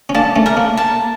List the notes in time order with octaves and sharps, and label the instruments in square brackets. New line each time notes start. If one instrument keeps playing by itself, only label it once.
[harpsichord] C#4
[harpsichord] A#3 D4 [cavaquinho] A5
[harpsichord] A3 C#4
[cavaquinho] A#4
[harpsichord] A#3
[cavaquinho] A5